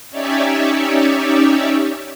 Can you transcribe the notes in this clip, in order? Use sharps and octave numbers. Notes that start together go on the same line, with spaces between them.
C#4 D#4 G4 C#5 D5 E5